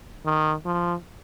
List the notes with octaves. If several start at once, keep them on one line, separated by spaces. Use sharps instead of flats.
D#3
F3